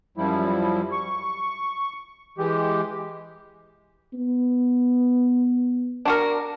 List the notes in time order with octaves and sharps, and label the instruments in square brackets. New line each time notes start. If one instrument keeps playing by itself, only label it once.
[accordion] F#2 F3 G3 E4
C#6
E3 G#3 G4
[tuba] B3
[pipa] D4 F#4 A#4